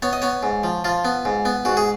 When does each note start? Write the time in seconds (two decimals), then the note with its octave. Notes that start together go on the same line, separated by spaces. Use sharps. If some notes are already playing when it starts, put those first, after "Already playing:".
0.02 B3 C#5
0.13 D#5
0.22 B3 C#5
0.43 G#2
0.64 F3
0.84 F3 F4
1.05 B3
1.25 G#2
1.45 B3
1.65 G#2 F#4
1.77 G#4